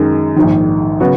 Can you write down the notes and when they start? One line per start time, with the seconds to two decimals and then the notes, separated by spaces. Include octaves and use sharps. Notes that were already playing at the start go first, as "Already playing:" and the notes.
Already playing: F#2 D#3 G#3 D#4 A#4
0.36 A#1 G#2 D#3
1.00 C#3 F#3 B3 F#4